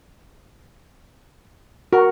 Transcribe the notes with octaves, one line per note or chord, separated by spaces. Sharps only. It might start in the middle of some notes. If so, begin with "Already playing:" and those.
F#4 A#4